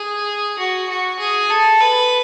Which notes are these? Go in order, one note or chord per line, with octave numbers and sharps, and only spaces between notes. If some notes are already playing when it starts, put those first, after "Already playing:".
Already playing: G#4
F#4
F#4
G#4
A4
B4